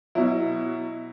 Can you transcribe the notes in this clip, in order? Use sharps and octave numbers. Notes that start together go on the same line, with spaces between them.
B2 F#3 E4